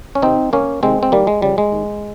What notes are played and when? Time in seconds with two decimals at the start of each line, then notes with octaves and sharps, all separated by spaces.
0.15 C#4
0.22 C3 D#3 C4 D#4
0.53 C2 A#3 C#4
0.83 C3 D#3 G#3 C4
1.03 C4
1.12 D#2 G3 A#3
1.27 G#3
1.42 C#3 F3 G3
1.58 G#3
1.72 D#2